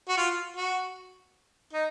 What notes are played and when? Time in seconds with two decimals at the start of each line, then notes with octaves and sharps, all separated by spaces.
0.09 F#4
0.17 F4
0.57 F#4
1.73 D#4